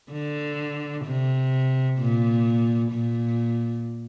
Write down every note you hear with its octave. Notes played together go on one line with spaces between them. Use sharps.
D3
C3
A#2
A#2